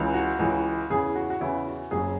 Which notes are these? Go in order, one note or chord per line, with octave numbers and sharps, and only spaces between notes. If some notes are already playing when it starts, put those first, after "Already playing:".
Already playing: C#2 C#3 E3
F#4
C#2 C#3 E3
E2 C#3 E3 G#4
F#4
F#4
E2 C#3 E3 E4
F#4
F#1 F#2 C#3 F#3 G#4